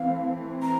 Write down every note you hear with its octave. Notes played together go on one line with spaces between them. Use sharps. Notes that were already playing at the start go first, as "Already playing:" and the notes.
Already playing: E3 A3 C4 F5
A#5